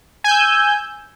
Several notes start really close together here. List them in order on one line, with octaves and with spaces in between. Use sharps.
G#5 G6 E6